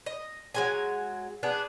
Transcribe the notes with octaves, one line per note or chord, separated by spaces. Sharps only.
D#5
F#3 G#3 G#5
B3 D4 G#4